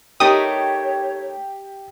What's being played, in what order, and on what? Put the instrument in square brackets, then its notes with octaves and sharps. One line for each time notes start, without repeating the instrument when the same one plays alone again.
[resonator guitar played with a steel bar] A3 D#4 A#4 [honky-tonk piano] G4 [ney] C#5 [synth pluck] D#6